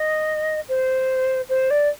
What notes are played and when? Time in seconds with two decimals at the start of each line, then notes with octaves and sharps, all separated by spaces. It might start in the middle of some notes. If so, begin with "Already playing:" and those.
Already playing: D#5
0.69 C5
1.49 C5
1.70 D5